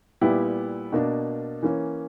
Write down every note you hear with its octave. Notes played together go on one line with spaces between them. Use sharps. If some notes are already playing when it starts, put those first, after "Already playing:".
A#2 G3 B3 E4 G4
B2 A#3 D4
E3 A#3 C#4